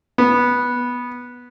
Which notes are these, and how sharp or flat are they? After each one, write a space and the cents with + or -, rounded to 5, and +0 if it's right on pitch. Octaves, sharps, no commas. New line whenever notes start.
B3 -10